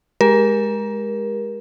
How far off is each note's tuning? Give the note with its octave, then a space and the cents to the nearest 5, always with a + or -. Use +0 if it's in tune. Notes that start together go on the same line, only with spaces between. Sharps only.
G#3 +0 G4 +10 A#4 +20